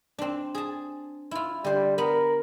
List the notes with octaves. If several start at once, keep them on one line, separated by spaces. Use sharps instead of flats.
C4 D4
G#4 A5
E4 F4
D3 G3 C5
B3 A#4 B5